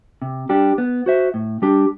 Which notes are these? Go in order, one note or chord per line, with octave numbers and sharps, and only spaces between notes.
C3
G3 D4 G4
B3
F#4 C5 E5
A2
G3 D4 G4